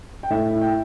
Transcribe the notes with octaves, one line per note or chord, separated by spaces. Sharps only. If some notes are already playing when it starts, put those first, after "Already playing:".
G5
A2 E5
E4
G5